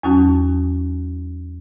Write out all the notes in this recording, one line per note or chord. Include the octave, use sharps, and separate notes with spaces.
E2 F#3 C#4 D#4 F#4 A5